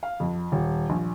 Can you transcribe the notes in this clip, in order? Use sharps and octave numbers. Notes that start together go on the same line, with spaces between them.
F5
F2
D#1
A#1